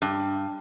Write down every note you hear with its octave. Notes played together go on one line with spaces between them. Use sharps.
G2